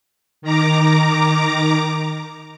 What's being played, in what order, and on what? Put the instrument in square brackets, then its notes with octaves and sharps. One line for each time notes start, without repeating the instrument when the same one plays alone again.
[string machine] D#3 A#5 D6